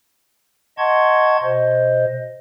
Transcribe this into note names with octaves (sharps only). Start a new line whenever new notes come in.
D#5 F#5 A5 C6 C#6 G#6
B2 C5 D#5